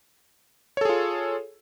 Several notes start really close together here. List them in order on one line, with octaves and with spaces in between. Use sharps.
C#5 A4 G#4 F4